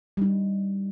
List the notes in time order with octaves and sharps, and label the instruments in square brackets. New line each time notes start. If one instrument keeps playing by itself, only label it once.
[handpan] G3 D#4